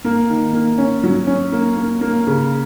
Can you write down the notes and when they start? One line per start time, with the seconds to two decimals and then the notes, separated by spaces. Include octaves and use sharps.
0.05 A#3
0.30 D#3
0.53 A#3
0.78 C#4
1.04 F#3
1.27 C#4
1.52 A#3
1.76 A#3
2.01 A#3
2.27 C#3